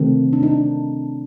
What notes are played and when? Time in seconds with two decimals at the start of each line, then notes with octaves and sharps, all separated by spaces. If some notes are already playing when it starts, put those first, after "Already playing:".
Already playing: C3 D#3 A3 C4
0.33 D4
0.43 D#4